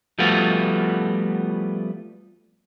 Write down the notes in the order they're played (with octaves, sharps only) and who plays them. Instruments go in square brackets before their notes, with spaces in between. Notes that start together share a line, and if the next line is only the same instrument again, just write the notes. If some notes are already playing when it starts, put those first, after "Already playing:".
[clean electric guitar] F3 G3 A3 B3 F4 F#4